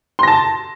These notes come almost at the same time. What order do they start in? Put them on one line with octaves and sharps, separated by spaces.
C6 A#6 A5